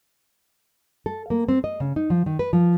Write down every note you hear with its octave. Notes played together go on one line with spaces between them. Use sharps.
A4
A#3
C4
D#5
C#3
D#4
F3
D#3
B4
F3